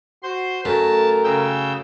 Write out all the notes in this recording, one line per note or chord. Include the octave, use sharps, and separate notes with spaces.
F#4 C5 C6
F#2 A3 A#4 A5
C#3 G5 E6